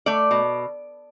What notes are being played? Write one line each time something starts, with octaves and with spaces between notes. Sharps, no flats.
A3 D5
B2